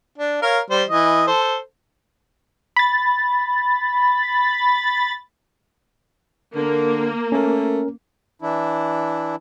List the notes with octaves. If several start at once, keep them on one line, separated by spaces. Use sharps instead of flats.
D4
A#4 C#5 F5
G3 C5
E3 D#5
A4 C5
B5 A6
D3 A#3
A3 C#4 A#4
E3 D4 E4